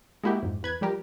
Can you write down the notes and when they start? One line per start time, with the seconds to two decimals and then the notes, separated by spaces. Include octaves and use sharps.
0.24 G#3 A#3 E4 F#4 G4
0.43 F2 G#2
0.63 E2 B4 G#6
0.81 F3 G3 G4 A#4